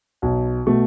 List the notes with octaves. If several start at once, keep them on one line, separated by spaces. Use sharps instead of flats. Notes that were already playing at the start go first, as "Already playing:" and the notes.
B1
B2 A3